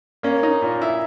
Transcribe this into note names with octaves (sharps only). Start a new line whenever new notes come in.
A#3 C#4
D#4
A#2
E4